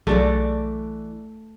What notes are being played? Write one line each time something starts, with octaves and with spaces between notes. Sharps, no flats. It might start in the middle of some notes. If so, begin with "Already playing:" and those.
B1 E3 F#3 A3 D4 G#4 D5